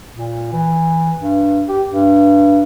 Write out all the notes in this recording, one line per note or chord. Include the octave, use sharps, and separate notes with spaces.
A#2
E3
G2
G4
G2